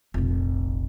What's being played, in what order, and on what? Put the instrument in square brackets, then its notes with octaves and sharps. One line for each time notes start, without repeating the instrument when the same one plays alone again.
[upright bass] F1 A#1